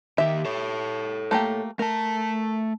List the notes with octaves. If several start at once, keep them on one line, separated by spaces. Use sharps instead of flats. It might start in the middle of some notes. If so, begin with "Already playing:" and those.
D#2 D#3 G4 E5
A4 C#5
A3 A#3 G4
A3 A#4 A5